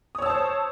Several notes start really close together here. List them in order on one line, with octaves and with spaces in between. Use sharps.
D#6 C#5 E6 A5 C5